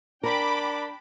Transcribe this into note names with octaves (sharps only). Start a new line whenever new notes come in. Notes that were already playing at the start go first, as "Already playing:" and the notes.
D4 A#4 G5 B5 D6